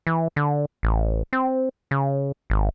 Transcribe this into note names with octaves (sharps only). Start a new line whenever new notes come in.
E3
D3
A1
C4
C#3
G#1